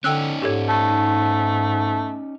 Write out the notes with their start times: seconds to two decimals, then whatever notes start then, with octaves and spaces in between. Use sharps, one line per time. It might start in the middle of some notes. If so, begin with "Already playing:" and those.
0.04 D3 C#4 D#4 G5 E6 F#6
0.42 G#2 G4 A4 C#5
0.69 A3